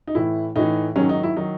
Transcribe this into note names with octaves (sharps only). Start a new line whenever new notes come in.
D#4
A2 E3 E4
A2 E3 D#4
G#2 D#3 F#3 C#4
D#4
E4
D#3 F#3 D#4